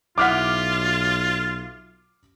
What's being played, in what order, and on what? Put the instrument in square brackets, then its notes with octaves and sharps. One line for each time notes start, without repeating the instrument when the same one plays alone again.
[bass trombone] B1 [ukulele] E4 F#5 [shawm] F4 [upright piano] D6 F6 B6